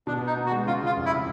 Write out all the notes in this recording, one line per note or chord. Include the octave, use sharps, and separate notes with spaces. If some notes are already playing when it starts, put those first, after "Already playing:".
B2 D4
B3
D#4
B3
F#4
G#3
C#3 F4
C#3 F4
F1
E4